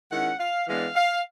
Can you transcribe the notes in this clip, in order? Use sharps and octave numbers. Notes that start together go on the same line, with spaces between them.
D#3 G#3 C#4 E4 F#5
F5
E3 G#3 B3 D4 F5
F5